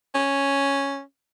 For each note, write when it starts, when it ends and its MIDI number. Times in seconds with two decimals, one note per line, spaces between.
0.15 1.02 61